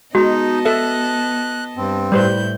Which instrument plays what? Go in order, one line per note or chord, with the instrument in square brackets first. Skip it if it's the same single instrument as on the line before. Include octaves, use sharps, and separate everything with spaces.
[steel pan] G#3 [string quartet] B3 D#5 A5 [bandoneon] D#4 [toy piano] F#4
[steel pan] A4 E5 [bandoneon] F#6
[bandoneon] G2 C4
[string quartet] A2 E4 G6 [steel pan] G3 B4 C5